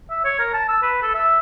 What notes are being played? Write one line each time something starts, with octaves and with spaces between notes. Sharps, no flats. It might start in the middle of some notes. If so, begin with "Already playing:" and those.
E5
C#5
A#4
A5
E6
B4
A4
E5